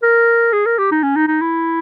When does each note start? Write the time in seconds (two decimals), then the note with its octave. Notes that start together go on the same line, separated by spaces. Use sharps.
0.03 A#4
0.53 G#4
0.66 A#4
0.79 G4
0.91 D#4
1.03 C#4
1.16 D#4
1.28 D#4
1.41 E4